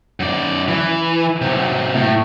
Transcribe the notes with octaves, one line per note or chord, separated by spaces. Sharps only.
F#2 D5
E3
C3 F#3
A2